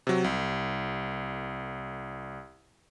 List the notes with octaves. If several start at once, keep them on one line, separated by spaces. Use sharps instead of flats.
C3 F#3
C2